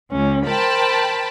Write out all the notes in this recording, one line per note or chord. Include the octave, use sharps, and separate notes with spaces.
C#2 C#4
A#4 C5 G5 A5 B5